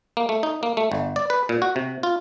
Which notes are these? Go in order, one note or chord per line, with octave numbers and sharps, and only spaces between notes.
A#3
A3
D#4
A#3
A3
G1
D5
B4
A#2
F#4
C3
F4